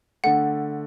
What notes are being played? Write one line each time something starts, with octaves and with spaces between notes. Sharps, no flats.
D3 A3 F#5